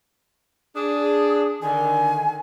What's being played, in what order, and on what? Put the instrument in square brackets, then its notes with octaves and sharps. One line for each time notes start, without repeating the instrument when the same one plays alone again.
[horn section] D4 G#4 [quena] D#6
[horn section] D3 D#3 [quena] G#5